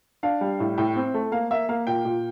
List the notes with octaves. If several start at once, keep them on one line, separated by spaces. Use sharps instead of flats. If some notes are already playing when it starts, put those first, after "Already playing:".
D4 F5
G3
A2
A2 G5
C4
A3
A#3 F5
A#3 E5
A#3 F5
A#2 G5
A#2